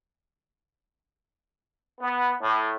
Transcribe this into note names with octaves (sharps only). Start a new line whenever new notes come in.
B3
A2